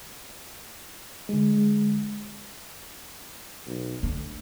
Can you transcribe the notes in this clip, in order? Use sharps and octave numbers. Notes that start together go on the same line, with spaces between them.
D3 G#3
B1
D3 A3 D4